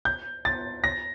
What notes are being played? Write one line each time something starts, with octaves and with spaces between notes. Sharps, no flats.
G6
A6
A#6